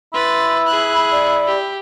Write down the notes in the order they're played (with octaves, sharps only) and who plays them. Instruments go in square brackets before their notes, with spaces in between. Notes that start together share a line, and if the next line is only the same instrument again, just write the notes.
[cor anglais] E4 [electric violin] B4 A6 [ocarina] C6
[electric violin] G#4 F#6 [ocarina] B5
[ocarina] D5
[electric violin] G4